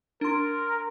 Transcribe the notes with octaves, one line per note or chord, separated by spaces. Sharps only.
D4 A#4 C6